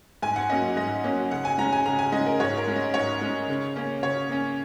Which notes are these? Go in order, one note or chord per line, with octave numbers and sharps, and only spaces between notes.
G#2 G#5
F#5
F#3 A#3 C#4 D#5
G#2 D#5
F#3 A#3 C#4
C#3 F#5
G#5
G#3 C#4 A#5
G#5
C#3 A#5
G#5
G#3 C#4 D#5
A#4
G#2 C#5
A#4
G#3 C#4
D#5
G#2 C#5
G#3 C#4
C#3
A#3 C#4
C#3 C#5
A#3 C#4